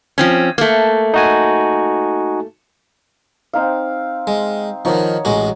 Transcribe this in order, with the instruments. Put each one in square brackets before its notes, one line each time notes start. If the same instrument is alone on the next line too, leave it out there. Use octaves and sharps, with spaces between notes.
[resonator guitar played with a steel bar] F3 C4 C#4
A3 A#3
[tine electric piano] D#4 F#4 G#5
[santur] C4 D#4 F5
[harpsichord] G#3
[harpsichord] D#3 F3 [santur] D#4 C#5 F#5
[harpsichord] A1 G#3 F#4